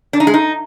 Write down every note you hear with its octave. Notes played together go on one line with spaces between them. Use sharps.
D4
D#4
G#3
D#4